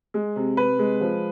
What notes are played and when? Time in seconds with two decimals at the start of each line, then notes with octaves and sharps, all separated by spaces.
0.14 G#3
0.36 C3
0.57 C3 B4
0.79 G#3
1.01 F3